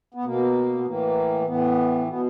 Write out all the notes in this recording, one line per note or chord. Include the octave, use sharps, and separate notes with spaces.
B3
B2 A#3
B3
A2 E3 A#3
A2 E3 B3
B2 B3